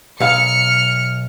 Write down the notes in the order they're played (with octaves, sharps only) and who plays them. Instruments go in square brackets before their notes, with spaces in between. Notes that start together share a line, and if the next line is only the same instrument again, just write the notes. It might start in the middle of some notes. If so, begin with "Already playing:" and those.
[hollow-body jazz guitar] B1 F5 [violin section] F6 C#7